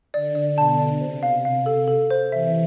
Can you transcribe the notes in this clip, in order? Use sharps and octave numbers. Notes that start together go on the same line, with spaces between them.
D3 D5
D5
B2 A5
D5
C3 C5
F5
F5
A4
A4
C5
C3 E3 E5